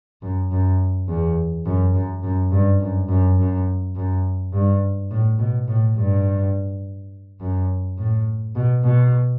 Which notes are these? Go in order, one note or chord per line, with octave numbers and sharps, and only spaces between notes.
F#2
F#2
E2
F#2
F#2
F#2
G2
F#2
F#2
F#2
F#2
G2
A2
B2
A2
G2
F#2
A2
B2
B2